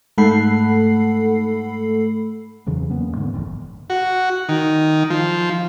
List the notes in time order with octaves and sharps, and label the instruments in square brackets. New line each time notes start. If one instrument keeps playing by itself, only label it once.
[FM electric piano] G#2 A3 A4 F#5 B5 C7
[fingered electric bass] E2 C#3 E3 F#3
E2 A#3 B3 C#4
G#2 D3 F3 B3
F1 A#1 G2 D#3
[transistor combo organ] F#4
D#3
F3